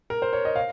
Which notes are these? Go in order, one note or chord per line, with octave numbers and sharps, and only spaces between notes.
A#4
C5
C#5
D#5
F5